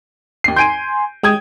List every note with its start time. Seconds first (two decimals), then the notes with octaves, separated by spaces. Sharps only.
0.44 D#2 C7
0.56 G#5 C6 G6 D7 D#7
1.23 G#3 G5 D#6 G#6